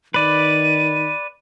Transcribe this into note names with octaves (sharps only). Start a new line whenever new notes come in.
D#3 B4 D5 D#7